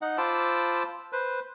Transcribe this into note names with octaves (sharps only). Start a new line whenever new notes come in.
D#4 D#5 F#5
F4 C5 A5 B5 D6 E6
B4 C5